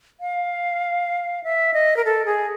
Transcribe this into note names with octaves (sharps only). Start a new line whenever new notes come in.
F5
E5
D#5
A#4
A4
G#4